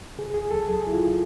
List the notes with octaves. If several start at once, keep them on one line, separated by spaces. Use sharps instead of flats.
C#3 G#4
D2 G#4
F#3 A4
D2 G#4
C#3 E4
F4